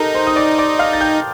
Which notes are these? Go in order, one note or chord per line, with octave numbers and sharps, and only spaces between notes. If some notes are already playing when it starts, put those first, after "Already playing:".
Already playing: D#4 G4 A4 A#4 G5 A#5
C5 C6
D#6
D5 D6
D5 D6
F5 F6
A6
G5 G6